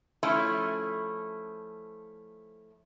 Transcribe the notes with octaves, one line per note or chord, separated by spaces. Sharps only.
F3 A3 C#4 E4